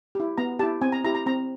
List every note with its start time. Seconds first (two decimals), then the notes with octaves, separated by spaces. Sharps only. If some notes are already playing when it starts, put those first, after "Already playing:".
0.15 E4 G4
0.38 B3 A#5
0.59 E4 G4 A5
0.82 C4 G#5
0.92 A#5
1.04 E4 G4 A#5
1.15 A#5
1.26 C4 A#5